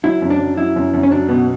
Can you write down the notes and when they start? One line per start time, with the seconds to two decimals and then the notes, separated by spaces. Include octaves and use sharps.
0.03 F#3 E4
0.21 F#2
0.30 D4
0.39 F#3
0.57 F#3 E4
0.76 F#2
0.93 F#2
1.03 C#4
1.11 F#3 D4
1.29 B2 B3